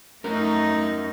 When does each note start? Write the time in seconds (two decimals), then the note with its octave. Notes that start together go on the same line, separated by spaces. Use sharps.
0.24 A3 C#4 D#4 A#4